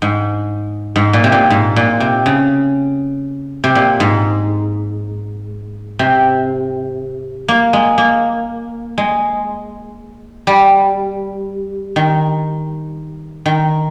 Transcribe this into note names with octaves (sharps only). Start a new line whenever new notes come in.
G#2
G#2
A#2
C3
A#2
G#2
A#2
C3
C#3
C3
A#2
G#2
C3
A#3
G#3
A#3
G#3
G3
D#3
D#3